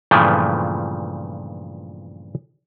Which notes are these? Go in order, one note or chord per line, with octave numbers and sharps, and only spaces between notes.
G2 A#2 C#3 E3 F3 A3